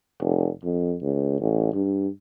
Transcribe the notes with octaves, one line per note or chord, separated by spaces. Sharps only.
F1
F2
C#2
A1
G2